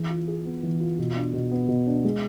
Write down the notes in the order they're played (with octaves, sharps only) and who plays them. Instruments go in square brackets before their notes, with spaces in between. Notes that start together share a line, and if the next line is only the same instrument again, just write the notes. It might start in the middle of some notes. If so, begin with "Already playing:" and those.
Already playing: [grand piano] E3 G#4
F4
G#4
B3
E3
F4
B2
D4
B2
B3
B2
D4
G#3